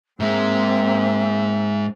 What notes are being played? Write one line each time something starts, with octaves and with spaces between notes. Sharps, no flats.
G#2 G#3 A#3 C4 E5